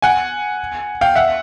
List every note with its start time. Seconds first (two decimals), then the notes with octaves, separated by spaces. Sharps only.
0.02 F#5 G#5
1.01 F5 G5
1.15 E5 F#5